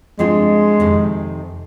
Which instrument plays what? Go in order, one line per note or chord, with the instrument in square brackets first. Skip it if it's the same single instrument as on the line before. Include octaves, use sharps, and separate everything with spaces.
[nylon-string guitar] G2 F3 C4 F4 [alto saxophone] G#3
[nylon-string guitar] F2 C3 D#3